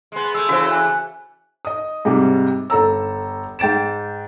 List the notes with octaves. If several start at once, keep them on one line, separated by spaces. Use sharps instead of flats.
G#3 B3
G#3 A3 E6
C#3 E3 A3 F#4 C5
G#5 F#6
D#5 D#6
G#2 C3 G3
G1 A4 A#5 E6
G#2 G5 A6 D7 E7